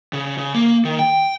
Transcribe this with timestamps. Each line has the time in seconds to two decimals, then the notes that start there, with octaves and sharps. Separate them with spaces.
0.13 C#3
0.38 C#3
0.54 A#3
0.85 D#3
0.99 G5